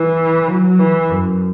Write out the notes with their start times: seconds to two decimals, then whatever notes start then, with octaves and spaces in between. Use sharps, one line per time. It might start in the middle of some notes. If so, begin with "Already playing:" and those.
Already playing: E3
0.48 F#3
0.79 E3
1.10 F#2